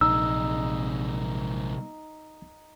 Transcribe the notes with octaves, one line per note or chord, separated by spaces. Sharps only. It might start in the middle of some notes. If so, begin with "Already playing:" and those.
A#1 C3 G#3 D#4 E6